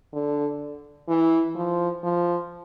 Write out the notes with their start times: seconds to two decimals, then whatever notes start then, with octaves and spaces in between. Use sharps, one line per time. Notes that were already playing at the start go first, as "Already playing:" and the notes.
0.13 D3
1.08 E3
1.55 F3
2.03 F3